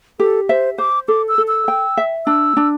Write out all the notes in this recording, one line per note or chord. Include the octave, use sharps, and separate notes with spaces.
G4 A4
C5 E5
C5 D6
A4 D6
E6
A4
E6
G5
E5
D4 E6
D4